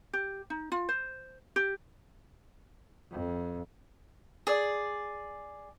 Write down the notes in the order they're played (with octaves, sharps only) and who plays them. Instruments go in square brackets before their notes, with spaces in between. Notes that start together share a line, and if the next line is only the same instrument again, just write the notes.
[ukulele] G4
D#4
F4
C5
G4
[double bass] F2
[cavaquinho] G#4 D5